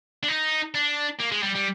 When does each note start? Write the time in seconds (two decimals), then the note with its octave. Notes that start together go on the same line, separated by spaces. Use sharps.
0.23 D4
0.28 D#4
0.74 D4
1.20 A#3
1.32 G#3
1.43 G3
1.55 G3